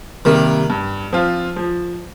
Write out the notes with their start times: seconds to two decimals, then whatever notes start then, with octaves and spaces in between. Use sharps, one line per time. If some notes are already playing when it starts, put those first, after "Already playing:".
0.25 C3 D#3 G3 A#3
0.70 G2
1.13 F3 C4 F4
1.56 F3